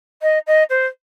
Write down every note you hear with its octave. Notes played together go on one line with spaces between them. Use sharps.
D#5
D#5
C5